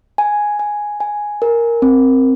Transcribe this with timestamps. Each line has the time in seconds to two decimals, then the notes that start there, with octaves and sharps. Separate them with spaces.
0.18 G#5
0.59 G#5
1.00 G#5
1.42 A#4
1.82 C4